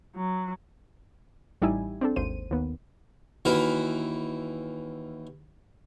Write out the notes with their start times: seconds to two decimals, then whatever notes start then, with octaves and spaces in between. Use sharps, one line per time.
0.15 F#3
1.62 A1 G3 D#4 E4 E5 G#5
2.01 C4 D4 A4
2.16 G#1 D#2 C5 D#7
2.51 D#2 B3
3.45 D#2 E3 F#4 A#4 B4 A#5